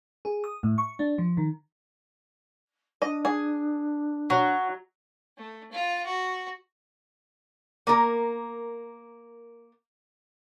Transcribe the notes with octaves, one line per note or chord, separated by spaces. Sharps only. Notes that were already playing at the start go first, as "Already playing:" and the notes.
G#4
D#6
A2
C#6
D4
F3
D#3
D4 D#5
G#4
F#3 F#4
A3
F4
F#4
A#3 A#4